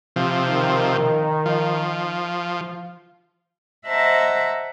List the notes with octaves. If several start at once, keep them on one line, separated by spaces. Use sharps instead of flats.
C3 F3
D#3
F3
C5 D#5 E5 F#5 A5 A#5